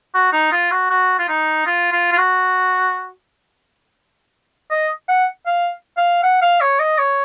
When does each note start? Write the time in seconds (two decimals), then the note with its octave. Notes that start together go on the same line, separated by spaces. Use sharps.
0.15 F#4
0.33 D#4
0.52 F4
0.72 F#4
0.90 F#4
1.19 F4
1.28 D#4
1.66 F4
1.92 F4
2.12 F4
2.18 F#4
4.71 D#5
5.08 F#5
5.46 F5
5.97 F5
6.23 F#5
6.42 F5
6.61 C#5
6.80 D#5
6.99 C#5